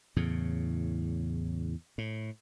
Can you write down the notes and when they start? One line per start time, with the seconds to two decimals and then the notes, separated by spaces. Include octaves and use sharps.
0.16 E2 A2 C#3
1.98 A2